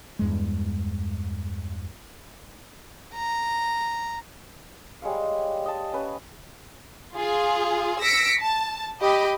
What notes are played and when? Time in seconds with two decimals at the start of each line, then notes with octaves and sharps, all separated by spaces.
0.19 E2 G2 G#3
3.14 A#5
5.02 G3 G#3 C#5 F5
5.66 D#5 A5
5.92 C#4 B4
7.17 F4 G#4
8.02 E6 A#6 B6 C#7 D7
8.40 A5
8.99 G4 D#5 B5